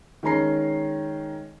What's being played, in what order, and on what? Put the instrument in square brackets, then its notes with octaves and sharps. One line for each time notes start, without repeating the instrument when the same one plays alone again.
[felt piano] D#3 G#3 C#4 A#5 C7